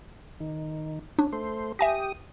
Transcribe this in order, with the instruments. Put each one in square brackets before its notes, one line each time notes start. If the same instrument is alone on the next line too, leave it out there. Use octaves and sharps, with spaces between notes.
[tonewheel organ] D#3
[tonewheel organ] C#4 [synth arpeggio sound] D4
[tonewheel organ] A3 C5
[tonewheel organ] G4 D#6 [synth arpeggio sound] E5 G#5 A#6